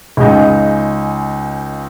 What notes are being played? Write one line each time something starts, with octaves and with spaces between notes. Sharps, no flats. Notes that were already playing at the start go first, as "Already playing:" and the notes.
C#2 C#3 G#3 D#4